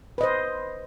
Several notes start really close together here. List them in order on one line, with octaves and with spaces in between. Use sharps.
B4 D#5 C5